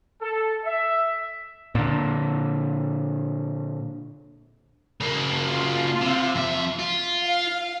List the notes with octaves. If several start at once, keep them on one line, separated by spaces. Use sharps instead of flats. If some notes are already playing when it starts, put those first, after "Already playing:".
A4
E5
A#2 D3
C#3 A#3
F4
C3
F2 E5
F4
F5